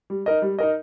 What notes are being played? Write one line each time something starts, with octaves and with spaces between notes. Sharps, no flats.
G3
D#4 A#4 D#5
G3
D#4 A#4 D#5